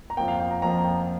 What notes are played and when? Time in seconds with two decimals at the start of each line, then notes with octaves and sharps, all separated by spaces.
0.10 A#5
0.17 F2 F3 A#3 G5
0.28 F5
0.40 G5
0.51 A#5
0.62 F2 F3 A#3 A#5
0.84 G5